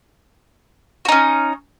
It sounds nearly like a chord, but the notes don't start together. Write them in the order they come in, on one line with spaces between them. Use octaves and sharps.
F#4 D#4 C#4